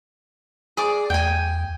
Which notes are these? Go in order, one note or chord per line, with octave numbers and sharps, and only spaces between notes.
G#4 D5 D6
E2 G5 G#5